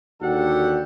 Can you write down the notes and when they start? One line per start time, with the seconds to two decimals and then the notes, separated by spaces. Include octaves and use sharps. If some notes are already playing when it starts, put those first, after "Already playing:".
0.22 D#2 D3 F#4 G4 A4 F#5